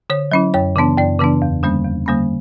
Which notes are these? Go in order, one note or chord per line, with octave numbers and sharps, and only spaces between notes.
D3 C#5
F#3 C#4 E4
F#2 C#5
C#3 E3 B3 D4
F#2 D5
C#3 E3 B3 D4
E2
D3 G3 A#3 C#4
E2
D3 G3 A#3 C#4